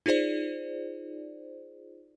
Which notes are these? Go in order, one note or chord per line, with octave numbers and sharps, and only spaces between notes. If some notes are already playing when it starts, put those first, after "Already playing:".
D#4 F4 G#4 C5 D5